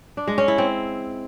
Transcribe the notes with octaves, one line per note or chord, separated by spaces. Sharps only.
D4
G#3
C#4
E4
C4